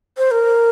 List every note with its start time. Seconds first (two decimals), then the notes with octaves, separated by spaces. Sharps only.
0.18 C5
0.31 A#4